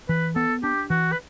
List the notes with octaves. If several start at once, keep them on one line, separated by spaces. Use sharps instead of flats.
E3 B4
B3 A4
D4 G4
E3 F#4
B4